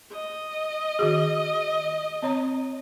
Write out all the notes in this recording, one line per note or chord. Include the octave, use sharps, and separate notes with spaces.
D#5
D#3 F#4 G#4
C4 C#5 A#5